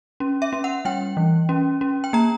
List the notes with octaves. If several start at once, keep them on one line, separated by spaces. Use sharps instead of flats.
C#4
E5
C#4
F#5
G3 G5
E3
C#4
C#4
G5
A#3 A#5